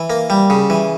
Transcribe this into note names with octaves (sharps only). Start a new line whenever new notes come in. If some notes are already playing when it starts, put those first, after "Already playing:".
Already playing: E3
A#3
G3
C#3
E3